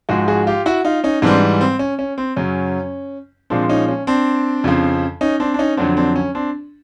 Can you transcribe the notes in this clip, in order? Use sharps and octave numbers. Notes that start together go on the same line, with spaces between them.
G#2 F3 G#3 F#4 G#4
F#4 G#4
F4 G4
E4 F#4
D#4 F4
C#4 D#4
G#2 E3 G3 C4 D4
C4
C#4
C#4
C4
F#2 C#3 F#3 C#4
A#2 F3 G#3 C4 D4
C#4 D#4
C#4
C4 D4
F2 C#3 F3
C#4 D#4
C4 D4
D4
C#4 D#4
F2 D3 F#3 C4 D4
C4 D4
C#4
C4 D4